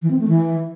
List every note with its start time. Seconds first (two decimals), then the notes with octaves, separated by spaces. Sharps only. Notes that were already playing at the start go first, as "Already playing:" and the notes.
0.02 E3
0.11 C4
0.19 A3
0.28 E3